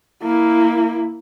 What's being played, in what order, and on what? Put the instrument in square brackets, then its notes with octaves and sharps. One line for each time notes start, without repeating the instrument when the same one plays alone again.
[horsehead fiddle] A#3 E4